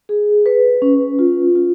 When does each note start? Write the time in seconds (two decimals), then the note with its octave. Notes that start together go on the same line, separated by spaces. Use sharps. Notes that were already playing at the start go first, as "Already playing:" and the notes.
0.09 G#4
0.46 B4
0.82 C#4
1.19 F4
1.55 F4